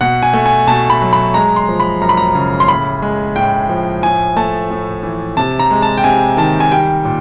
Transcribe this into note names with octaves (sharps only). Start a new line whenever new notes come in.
B2 F#5
G#5
A3
G#5
B2 A5
B5
F#3
B5
G#3 A#5
C6
F3
B5
F#2 A#5
B5
A#5
C#3
C6
A2 B5
G#3
A2 G5
F3
A2 G#5
A3 A5
A2
E3
C3 A5
A#5
G#3
A5
G5
C3 G#5
D#3 A5
G#5
G3 G5
A#2